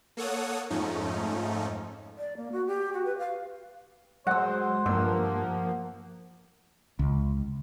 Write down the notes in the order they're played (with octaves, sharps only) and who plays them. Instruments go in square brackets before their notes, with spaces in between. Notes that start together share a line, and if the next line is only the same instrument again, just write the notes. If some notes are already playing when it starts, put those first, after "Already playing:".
[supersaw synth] A#3 A4 C#5 F#5 D#6
F2 G#2 F3 A3 C#4 D#4
[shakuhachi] D5
A#3
F#4
G4
F#4
B4
F5
[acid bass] F#3 [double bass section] G#3 [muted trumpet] C5 [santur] F#5 E6
[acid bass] G2 [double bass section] F3 A#3 [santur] E6
[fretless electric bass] C#2